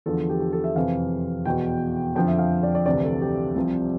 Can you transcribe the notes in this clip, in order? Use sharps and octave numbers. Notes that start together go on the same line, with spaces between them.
E2 D3 F3 A4
G4
G4
A4
E5
F2 C3 E3 F5
E2 B2 G5
F2 D3 F3 G5
E5
F5
D5
D5
D2 C3 E3 D5
A4
G4
C2 C3 F3